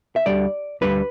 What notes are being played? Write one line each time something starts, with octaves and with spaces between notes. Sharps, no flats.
E5
D2 D3 G3 D5
D2 D3 G3 B4